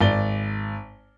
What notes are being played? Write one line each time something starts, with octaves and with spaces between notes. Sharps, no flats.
G#1 D5 G7